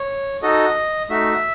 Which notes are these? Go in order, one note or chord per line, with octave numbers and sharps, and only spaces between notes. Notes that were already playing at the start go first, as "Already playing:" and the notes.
Already playing: C#5
D#4 F#4 A4 D#5
A3 D#4 F#4 E5